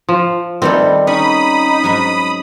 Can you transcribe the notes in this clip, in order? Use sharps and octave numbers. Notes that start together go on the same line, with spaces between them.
F3
C3 D#3 G3 B3 C4 A4 D5
C#4 D#4 B5 D#6
G#2 F#3